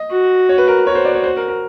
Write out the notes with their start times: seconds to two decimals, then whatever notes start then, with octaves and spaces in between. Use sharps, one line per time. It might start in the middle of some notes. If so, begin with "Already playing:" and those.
Already playing: D#5
0.11 F#4
0.49 C#5
0.58 B4
0.68 A#4
0.86 F#4 C#5
0.95 C5
1.05 D5
1.15 C#5
1.24 C5
1.37 A#4
1.49 A#4